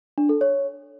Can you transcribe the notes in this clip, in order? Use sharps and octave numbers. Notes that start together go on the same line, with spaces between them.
D4
A4
C#5